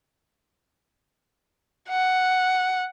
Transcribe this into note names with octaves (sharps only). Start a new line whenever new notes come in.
F#5